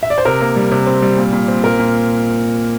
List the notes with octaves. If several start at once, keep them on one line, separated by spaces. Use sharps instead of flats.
E5
D5
C5
C3 A#4
A#3
G3
C3
C4
G3
A#2
A#2
C4
A#2 A#4
A#2